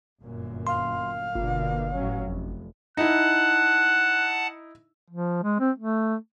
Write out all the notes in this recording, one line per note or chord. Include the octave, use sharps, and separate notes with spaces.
G1 F#2 A#2
F5 C6
G1 B2 D3 A#3
A1 F#3 C#4
F1
D#4 E4 F#5 A5 F#6
F3
G#3
C4
A3